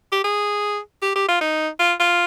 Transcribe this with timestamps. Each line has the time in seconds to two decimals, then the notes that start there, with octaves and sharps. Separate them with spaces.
0.12 G4
0.24 G#4
1.02 G4
1.16 G4
1.28 F4
1.41 D#4
1.79 F4
2.00 F4